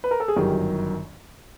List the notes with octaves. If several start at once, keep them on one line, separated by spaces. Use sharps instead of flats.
B4
A#4
A4
G#4
G1 F#2 D#3 G4